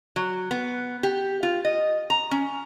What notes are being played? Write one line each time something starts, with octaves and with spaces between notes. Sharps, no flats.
F#3
B3
G4
F4
D#5
A#5
C#4